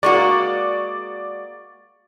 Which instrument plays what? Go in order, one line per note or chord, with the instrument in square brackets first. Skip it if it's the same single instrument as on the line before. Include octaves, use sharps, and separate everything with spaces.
[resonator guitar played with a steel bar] G#3 A#3 F#4 [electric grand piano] D5 C#6